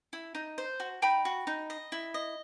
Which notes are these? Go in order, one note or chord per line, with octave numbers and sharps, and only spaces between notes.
E4
D#4
C5
F#4
D#4 G5 B5
F#4
D#4
D#5
E4
D#5